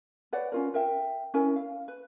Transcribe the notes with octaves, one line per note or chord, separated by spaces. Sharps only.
B4 C#5 D5 F#5
C#4 F4 A#4
A#4 E5 G5
C#4 E4 A#4 G#5
F5
B4